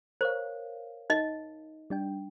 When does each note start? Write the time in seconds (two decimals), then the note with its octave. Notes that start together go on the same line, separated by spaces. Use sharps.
0.21 A#4 C5 C#5 F5
1.10 D#4 D#5
1.90 G3 D4 G5